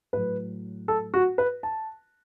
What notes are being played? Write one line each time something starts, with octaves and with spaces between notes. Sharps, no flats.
A2 F#3 B4
A4
F#4
B4
A5